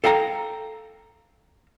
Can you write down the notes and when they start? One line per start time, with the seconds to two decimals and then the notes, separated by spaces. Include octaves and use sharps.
0.04 A4 F5 G5 A#5